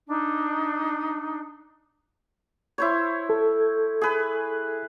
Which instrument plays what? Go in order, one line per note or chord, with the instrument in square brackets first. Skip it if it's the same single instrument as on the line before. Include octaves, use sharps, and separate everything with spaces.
[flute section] D4 D#4
[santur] E4 C5 C#5
[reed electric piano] A4
[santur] G#4 B4